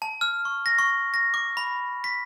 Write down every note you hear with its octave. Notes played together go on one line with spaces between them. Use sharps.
A5
F6
C#6
A#6
C#6
A#6
D6
B5
B6